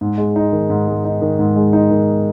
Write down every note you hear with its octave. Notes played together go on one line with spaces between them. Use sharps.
G#2
G#3
D#4
D#3
G#2
G#3
D#4
D#3
G#2
G#3
D#4
D#3